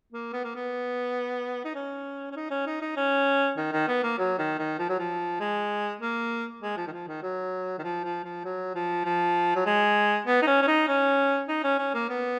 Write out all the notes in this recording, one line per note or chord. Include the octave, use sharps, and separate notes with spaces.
A#3
B3
A#3
B3
D#4
C#4
C#4
D#4
C#4
D#4
D#4
C#4
D#3
D#3
B3
A#3
F#3
D#3
D#3
F3
F#3
F3
G#3
A#3
G#3
F3
D#3
F3
D#3
F#3
D#3
F3
F3
F3
F#3
F3
F3
F#3
G#3
B3
D#4
C#4
C#4
D#4
C#4
D#4
C#4
C#4
A#3
B3